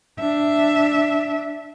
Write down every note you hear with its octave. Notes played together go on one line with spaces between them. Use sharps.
D4 E5